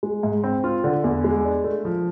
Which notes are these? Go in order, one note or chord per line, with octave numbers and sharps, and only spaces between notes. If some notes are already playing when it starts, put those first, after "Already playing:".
G#3
G#2
C4
F4
D3
E2
G#3
D4
A3
F3